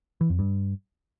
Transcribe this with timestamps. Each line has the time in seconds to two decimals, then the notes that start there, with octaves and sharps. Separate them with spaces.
0.21 E3
0.30 F2
0.39 G2